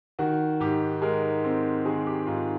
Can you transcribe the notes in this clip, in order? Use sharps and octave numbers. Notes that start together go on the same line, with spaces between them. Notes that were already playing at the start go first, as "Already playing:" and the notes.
D#3 F#4
G#2 G4
G#3 A#4
C4
D#3 G#4
G4
G#2 F4